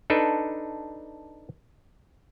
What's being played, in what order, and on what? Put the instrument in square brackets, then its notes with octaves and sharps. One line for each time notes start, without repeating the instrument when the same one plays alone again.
[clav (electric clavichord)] D4 D#4 A4 B4